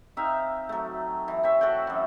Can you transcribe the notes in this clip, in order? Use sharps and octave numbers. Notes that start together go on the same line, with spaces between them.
C4 D#4 E5 F5
F#3 A3
E3
C4 C#5 E5
F#4 A4 F#5 G5
F#2 E3